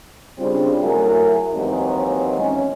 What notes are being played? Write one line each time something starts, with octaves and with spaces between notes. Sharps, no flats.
C#3 G3 C4 D4 F4
F#3 A3 E4 G#4 A#4
D#2 E3 F#3 G#3 C4 D#4
C#4